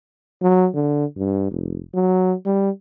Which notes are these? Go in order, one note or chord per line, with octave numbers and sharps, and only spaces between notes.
F#3
D3
G2
F1
F#3
G3